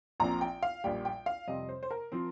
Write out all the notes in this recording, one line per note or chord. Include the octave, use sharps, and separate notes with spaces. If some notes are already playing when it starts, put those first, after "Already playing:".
A#1 A#2 F3 C4 A#5
G5
F5
A#1 A#2 G3 G5
G5
F5
F2 C3 G3 C4 D#5
C5
C5
A#4
F3 C4